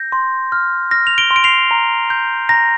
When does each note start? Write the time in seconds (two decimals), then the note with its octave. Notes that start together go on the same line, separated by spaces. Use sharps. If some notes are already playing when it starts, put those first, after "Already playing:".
Already playing: G6 A#6
0.12 C6
0.52 F6
0.91 F6 A#6
1.07 F7
1.18 D7 G7
1.31 C6
1.36 D7
1.44 C7 F7
1.71 A#5
2.10 G6
2.49 A#5 A#6